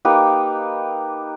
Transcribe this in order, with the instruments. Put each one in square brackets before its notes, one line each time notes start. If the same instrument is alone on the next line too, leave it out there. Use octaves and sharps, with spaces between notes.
[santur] A#3 D#4 G4 B4